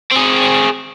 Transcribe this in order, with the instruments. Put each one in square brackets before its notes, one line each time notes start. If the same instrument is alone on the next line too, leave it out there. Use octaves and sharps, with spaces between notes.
[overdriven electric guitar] C4 G#4